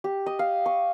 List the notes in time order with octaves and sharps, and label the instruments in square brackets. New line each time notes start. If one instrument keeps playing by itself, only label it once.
[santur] G4
D#5
F5
C#6